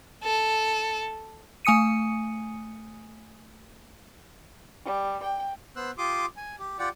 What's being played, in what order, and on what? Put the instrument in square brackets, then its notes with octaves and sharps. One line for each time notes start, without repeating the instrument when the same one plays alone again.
[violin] A4
[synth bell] A3 G#5 D#6 C#7 D#7
[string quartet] G3
G5
[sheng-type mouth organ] B3 C5 E6 F#6
F4 G4 C6 D6 D#6
G#5
G4
F4 G4 D5 F#5 G5